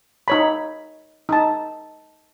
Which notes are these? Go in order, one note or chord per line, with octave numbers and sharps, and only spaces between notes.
D#4 C#5 B5
D#4 A5